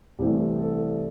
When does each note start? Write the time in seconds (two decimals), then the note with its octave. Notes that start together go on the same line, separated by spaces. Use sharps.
0.19 C2 C3 E3 A3 G4
0.59 A4